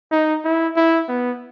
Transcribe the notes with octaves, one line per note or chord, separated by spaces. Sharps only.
D#4
E4
E4
B3